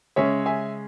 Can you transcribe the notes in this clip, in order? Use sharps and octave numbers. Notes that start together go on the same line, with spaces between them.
C#3 G#3 C#4 C#5 E5
E5 G#5